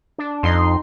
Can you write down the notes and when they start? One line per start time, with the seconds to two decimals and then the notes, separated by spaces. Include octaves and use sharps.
0.18 D4
0.43 F2 D#4 C6